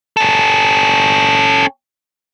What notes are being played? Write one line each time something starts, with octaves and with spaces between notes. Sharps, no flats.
C#4 A4